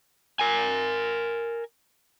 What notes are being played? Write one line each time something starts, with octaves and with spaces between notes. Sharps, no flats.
A#4 G#5